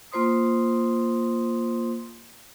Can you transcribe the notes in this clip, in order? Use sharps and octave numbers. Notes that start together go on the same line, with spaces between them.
A#3 F4 C5 C6 D#6